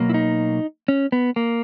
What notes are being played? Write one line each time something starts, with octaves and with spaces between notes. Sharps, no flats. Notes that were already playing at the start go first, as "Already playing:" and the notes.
Already playing: B2 F#3 A#3
E4
D#4
C#4
B3
A#3